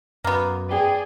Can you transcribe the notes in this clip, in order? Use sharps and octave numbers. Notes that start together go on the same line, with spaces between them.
F#2 A#3 B3
G#4 B4 D5 G5